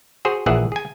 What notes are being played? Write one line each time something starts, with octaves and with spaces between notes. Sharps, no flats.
F#4 G#4 C5
A#1 A#2 E3 G#4 E5 F#5
G#4 G#5